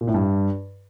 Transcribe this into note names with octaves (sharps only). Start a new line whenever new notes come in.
A#2
A2
G2